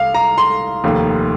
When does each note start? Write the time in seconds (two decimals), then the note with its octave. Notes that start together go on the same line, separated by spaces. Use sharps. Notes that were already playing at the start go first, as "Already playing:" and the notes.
Already playing: C2 F5
0.14 A#5
0.38 C6
0.84 F1 D#2 D#3